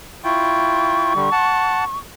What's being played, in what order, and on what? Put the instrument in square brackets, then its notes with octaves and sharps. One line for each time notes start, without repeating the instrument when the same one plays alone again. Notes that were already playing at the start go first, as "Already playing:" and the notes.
[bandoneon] E4 F4 G5 [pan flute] C#6
[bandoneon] D3 G3
F#5 A5